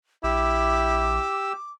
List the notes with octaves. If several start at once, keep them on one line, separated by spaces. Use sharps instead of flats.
A#1 E4 G4 D6 E6